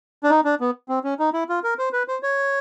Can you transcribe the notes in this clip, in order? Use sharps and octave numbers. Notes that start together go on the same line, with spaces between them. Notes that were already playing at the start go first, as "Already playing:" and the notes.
D4
D#4
D4
B3
C4
C#4
D#4
E4
F4
A#4
C5
B4
C5
C#5